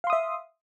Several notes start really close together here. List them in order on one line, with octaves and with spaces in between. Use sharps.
F5 C6 D#6 E5